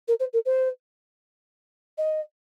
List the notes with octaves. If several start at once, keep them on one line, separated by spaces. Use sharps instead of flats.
A#4
C5
A#4
C5
D#5